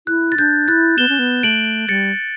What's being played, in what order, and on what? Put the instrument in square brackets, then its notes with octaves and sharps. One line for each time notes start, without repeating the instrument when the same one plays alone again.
[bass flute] E4 [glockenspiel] F#6
[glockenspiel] A6
[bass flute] D4 [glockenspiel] G6
[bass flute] E4 [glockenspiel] F#6 A6
[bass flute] B3 [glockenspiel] E7 G7
[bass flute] C#4
B3
[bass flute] A3 [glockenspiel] D7 F#7
[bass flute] G3 [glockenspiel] A6 C#7